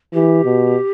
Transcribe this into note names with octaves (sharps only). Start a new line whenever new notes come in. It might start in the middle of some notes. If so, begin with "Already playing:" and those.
E3 G4
B2